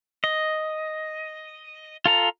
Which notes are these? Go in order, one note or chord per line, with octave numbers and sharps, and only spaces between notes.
D#5
F4 A4 A#5